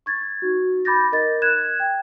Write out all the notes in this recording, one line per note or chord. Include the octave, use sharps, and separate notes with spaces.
C#6 G#6 A6
D#4 F#4
B5 D6 G6 A6 A#6
D#4 A#4 D#5 A6
F#6 G#6 E7
G5